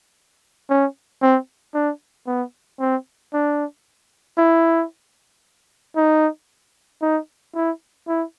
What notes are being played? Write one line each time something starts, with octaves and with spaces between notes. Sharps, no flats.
C#4
C4
D4
B3
C4
D4
E4
D#4
D#4
E4
E4